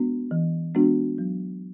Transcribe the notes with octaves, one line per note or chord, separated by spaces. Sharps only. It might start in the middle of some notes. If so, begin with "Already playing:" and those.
Already playing: G#3 B3 D4 F#4
E3
G#3 B3 D4 F#4
F#3